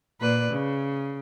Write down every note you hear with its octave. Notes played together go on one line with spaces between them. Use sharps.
A#2 B4 D5
C#3